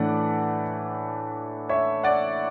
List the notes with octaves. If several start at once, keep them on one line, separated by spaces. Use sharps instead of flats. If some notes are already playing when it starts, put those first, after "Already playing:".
Already playing: A2 E3 A3 D4 D5 F#5
C#5 E5
D5 F#5